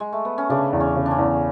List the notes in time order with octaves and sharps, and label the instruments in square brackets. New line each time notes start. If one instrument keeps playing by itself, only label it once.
[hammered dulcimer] G#3
A3
B3
C#4
[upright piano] C#3 [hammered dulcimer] D4
[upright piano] E2
[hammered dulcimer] C#4
[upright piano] C#3
[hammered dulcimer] D4
C#4
[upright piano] E2